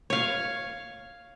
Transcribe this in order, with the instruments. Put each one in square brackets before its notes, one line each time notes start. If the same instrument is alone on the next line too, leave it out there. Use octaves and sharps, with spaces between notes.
[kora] C#5 F5